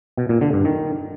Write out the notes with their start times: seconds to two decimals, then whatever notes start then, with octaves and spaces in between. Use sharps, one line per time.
0.17 B2
0.29 A#2
0.41 D3
0.53 G2
0.65 D#3